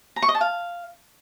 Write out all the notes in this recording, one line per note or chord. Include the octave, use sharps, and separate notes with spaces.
A#5
C#6
D#5
A5
F5